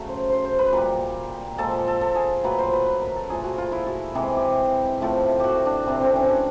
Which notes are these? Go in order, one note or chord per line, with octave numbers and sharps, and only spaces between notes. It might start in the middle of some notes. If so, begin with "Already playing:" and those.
Already playing: C#3 F#3 A3
C5
C5
C5
B4
A#2 G3 A#4
A#2 F3 G#3 A4
A4
A4
G#4
A#2 F#3 A3 B4
C5
B4
B4
A#4
A4
A#2 F3 A3 G#4
F#4
F4
E4
F#4
C3 E3 G#3 G#4
G4
A2 F3 A3
F#4 G4
D4
C3 E3 A3 C4
C4
C#4
D4